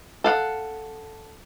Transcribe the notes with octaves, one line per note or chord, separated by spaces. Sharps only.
A4 F5 F#5